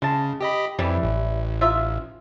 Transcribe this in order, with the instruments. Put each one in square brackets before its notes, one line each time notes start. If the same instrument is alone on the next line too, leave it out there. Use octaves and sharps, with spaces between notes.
[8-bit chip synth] C#3 [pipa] G#3 A5
[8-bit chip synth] G4 D#5 B5
[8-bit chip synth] F2 [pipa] E3 G3
[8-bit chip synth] A1
[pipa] D#4 F4 E5